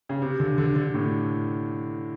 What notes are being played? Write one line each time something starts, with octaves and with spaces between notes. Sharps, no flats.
C#3
C3
D3
D3
D3
A2